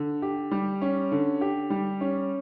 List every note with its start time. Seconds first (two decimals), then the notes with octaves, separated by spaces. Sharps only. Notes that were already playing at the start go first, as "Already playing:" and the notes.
Already playing: D3
0.22 G4
0.51 G3
0.82 C#4
1.11 D3
1.41 G4
1.70 G3
2.01 C#4